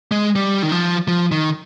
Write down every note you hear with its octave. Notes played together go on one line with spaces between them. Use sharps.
G#3
G3
D#3
F3
F3
D#3